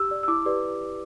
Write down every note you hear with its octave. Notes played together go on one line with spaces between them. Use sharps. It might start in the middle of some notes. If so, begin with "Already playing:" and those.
Already playing: G4 E6
D5
E6
E4 D6
G4 B4 D5